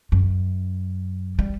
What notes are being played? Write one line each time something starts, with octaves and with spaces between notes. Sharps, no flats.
F#2
G3